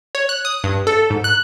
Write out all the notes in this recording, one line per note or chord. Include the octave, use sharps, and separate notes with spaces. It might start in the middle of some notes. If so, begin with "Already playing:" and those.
C#5
F#6
D#6
G2
A4
G#2
F#6